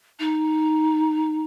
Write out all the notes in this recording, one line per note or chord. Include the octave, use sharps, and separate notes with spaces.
D#4